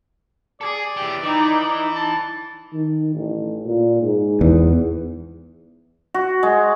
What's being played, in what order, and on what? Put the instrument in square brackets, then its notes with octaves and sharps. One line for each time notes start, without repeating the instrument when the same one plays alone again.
[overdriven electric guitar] G#4 A4 [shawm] D5
[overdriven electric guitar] E3 G4
[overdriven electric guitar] E3 [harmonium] D#4
[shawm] A5
[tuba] D#3
A1
A#2
G#2
[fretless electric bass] E2
[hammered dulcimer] F#4
G#3